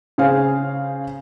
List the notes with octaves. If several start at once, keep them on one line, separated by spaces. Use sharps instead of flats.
C#3 G#4 C5 F5